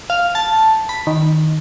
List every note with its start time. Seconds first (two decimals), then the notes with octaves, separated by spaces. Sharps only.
0.10 F5
0.35 A5
0.89 B5
1.07 D#3